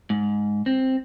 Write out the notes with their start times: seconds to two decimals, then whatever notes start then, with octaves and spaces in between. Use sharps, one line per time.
0.10 G#2
0.66 C4